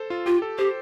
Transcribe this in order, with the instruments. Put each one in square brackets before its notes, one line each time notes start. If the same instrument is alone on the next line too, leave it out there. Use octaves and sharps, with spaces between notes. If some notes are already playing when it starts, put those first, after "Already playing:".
Already playing: [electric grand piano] A4 C5
F4
[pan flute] F4 [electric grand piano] G4
[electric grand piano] A4
[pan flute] G4 [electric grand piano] C5